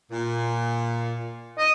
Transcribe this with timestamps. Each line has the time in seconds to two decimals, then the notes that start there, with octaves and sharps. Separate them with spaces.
0.10 A#2
1.58 D#5